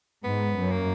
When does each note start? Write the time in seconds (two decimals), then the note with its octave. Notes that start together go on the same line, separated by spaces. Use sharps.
0.24 G#2 B3
0.56 F#2
0.71 A#3